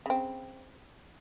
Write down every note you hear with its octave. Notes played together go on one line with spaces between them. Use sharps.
C#3 C4